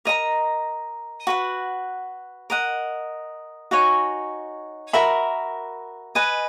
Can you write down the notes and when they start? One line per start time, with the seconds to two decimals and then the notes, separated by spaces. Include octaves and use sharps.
0.05 A#4 D#5 A#5
1.27 F#4 B4 F#5
2.50 A#4 D#5 F#5
3.71 D#4 F#4 C#5 G#5
4.93 F#4 A#4 E5 B5
6.15 B4 D#5 G#5